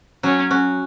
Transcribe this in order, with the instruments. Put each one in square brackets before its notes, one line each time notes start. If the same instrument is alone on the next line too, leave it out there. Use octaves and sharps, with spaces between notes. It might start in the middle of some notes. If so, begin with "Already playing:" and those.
[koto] F#3 [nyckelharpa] C#4
[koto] C#4 F#4